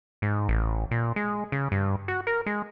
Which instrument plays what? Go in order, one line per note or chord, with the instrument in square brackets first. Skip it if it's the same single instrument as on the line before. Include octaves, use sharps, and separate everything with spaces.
[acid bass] G#2
A1
A#2
G#3
C#3
G2
F#4
A#4
G#3